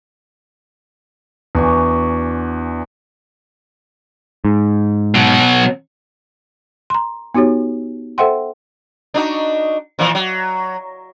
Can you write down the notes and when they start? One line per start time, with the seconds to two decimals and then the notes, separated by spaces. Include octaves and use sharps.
1.55 E2 D4 F#4 G#5
4.45 G#2
5.15 B2 F#3
6.90 A#5 C6
7.35 B3 D#4 F#4 G4 C#5
8.18 A4 C5 E5 F#5 G5 C6
9.14 D4 D#4 F#4
9.99 A#2 E3 F3
10.15 F#3